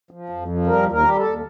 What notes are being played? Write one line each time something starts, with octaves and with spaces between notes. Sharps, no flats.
F3
F2
F3
G3 A#4
D#2
A#4
G3 G4
A4
D#2